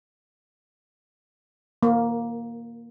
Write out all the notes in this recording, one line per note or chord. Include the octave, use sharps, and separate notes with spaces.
A#3